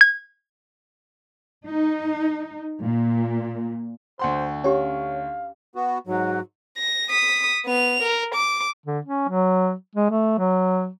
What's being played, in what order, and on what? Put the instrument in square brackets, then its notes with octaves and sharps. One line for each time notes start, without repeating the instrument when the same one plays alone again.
[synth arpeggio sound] G#6
[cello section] D#4
A#2
[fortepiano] D2 F#5 C6 [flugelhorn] C5
[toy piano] C#4 G4 [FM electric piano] C#5 [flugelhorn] F5
[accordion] B3 F#4
[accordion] G#2 F#3 [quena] F#4
[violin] A#6
D#6 B6
B3 F7
A#4
D6
[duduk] D3
C#4
F#3
G#3
A3
F#3